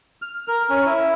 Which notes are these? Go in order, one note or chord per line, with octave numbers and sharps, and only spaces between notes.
F6
A#4
C#4
E4